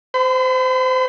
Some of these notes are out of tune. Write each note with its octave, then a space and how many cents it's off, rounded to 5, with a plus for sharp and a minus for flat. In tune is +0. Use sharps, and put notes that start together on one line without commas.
C5 -20 B5 +45